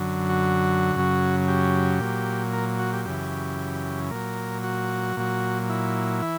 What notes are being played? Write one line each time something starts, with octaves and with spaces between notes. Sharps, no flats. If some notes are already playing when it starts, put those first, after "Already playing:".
Already playing: F#2 D3 F#3
F#4
F#2 C#3 F#3
G4
A#2 F#3
A#4
F#4
G4
F#2 C#3 E3 G4
A#2 F#3 A#4
F#4
A#2 F#3
E4
E3